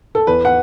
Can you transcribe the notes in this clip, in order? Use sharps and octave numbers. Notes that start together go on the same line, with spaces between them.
A4
E2 B4
F#5